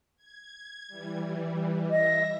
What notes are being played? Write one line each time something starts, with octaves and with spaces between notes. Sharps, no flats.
G#6
E3 G3
D#5 E5 A#6